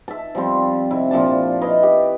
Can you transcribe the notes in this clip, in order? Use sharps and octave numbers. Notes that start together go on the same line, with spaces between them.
E5 A5
F3 G3 C4
C3 E4
A#2 F3 D4 A5
E4 B4 D#5 F5
G4